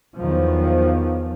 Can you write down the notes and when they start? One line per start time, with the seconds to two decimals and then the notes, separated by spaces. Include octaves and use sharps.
0.16 E2 D#3 F3 F#3